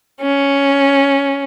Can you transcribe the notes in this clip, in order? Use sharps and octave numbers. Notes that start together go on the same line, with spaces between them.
C#4